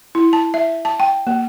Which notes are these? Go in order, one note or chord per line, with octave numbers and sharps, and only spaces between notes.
E4
A5
E5
A5
G5
A#3